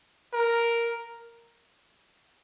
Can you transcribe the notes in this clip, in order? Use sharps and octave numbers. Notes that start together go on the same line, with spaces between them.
A#4